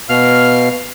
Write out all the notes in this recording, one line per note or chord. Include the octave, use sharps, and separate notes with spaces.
B2 F5 F6